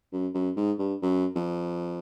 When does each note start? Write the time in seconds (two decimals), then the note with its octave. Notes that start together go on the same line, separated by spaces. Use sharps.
0.13 F#2
0.34 F#2
0.56 G#2
0.79 G2
1.02 F#2
1.36 F2